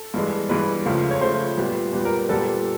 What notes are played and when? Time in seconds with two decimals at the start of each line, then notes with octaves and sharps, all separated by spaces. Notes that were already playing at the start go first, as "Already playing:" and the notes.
Already playing: A4
0.14 G2 E3 G#3
0.49 G2 E3 G#3 B4
0.85 C#2 C#3 F3 A3
1.11 C#5
1.21 C#2 C#3 F3 A3 C5
1.57 A#2 G3 B3
1.93 A#2 G3 B3
2.05 A#4
2.29 A#2 G3 B3 A4